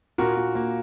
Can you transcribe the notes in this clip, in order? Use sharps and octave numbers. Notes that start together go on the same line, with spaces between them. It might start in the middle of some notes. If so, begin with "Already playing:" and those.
A#2 F#4 A#4
A#2
A#3